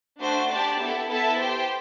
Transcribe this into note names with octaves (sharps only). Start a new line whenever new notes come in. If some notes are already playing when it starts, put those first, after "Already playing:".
A3 D4 F#4 C5
D4 G4 D5 A5
B3 E4 A4
B3 E4 A4 E5 A5
G4 C5 G5